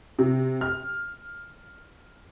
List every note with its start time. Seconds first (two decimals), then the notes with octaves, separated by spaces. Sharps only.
0.19 C3
0.61 F6